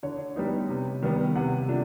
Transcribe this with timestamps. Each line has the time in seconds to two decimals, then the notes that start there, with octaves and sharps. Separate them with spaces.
0.03 D3 C#5
0.36 G3 B3 D#4
0.69 C3
1.02 D#3 G3 B3
1.35 C3 F#5
1.68 F3 A3 D4